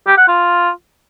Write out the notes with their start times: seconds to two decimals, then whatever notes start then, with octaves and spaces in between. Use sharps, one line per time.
0.07 G4
0.18 F#5
0.28 F4